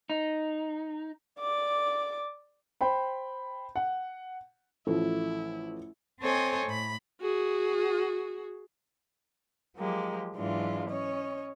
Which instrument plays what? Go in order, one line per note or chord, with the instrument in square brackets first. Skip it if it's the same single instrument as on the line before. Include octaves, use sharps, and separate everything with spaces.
[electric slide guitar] D#4
[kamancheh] D5 D6
[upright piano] C5 G5 B5
F#5
[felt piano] A1 F3 A3 [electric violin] E4
[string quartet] C4 A4 C5 C#5 D#5 G#5
A2 B5
[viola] F#4 G#4
[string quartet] F3 F#3 G#3 A#3 G4
G#2 E3 F#3 G#3 D4 F4
C#4 C#5 D#5